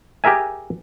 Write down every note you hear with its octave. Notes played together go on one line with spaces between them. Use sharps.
G4 G#4 A#4 E5 G#5